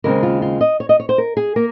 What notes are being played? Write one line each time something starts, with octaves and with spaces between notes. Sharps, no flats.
D#2 C#3 G#3 C4 A#4
F4
F4
D#5
C#5
D#5
C#5
C5
A#4
G#4
A#3 A#4